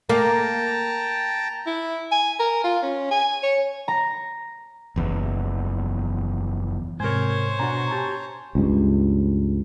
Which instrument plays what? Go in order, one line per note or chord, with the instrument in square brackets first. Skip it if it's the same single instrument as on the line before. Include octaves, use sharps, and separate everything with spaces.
[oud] A#3 [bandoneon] G5 A5 A#5
[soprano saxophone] E4
G#5
A#4
F4
C#4
G#5
C#5
[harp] A#5
[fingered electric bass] F#1 E2
[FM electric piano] G#2 C3 [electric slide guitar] A#4 G#5 [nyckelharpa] C5 C#5
[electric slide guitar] B2 D4 F#4 [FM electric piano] G#5 A#5 C#6
[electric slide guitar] G4 A5
[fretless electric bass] C#2 G2